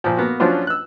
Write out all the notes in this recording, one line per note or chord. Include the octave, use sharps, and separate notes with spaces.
A#2 F3
A#3 B3 F#4
F3 F#3 C#4 D4 F4 C5
E6 F#6